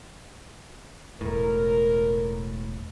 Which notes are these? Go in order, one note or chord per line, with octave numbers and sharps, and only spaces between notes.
E1 A2 A#4